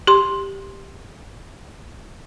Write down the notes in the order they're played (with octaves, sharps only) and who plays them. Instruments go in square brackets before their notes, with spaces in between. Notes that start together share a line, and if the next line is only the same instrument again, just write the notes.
[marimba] G4 C6